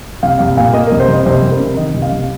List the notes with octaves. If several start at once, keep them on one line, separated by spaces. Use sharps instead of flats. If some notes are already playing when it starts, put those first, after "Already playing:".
C2 F5
C2 F5
A#2 F5
A#3 D#5
C2 A#4
C5
C2
D#5
C2 C5
C2
A#4
C3
D#3 D#5
C2
F5
C2